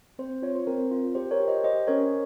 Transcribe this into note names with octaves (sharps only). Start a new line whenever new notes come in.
C4 C5
F4 C#5
C5
C4 A#4
F4
G4 C5
A#4 C#5
G4
C5 D#5
G4 C5 D#5
C#4 A#4 C#5